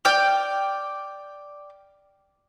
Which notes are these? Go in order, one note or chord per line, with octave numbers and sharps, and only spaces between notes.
D5 G5 F6